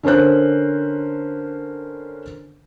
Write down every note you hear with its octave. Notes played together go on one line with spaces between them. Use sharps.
D3 C#4 A#4 C5 F#6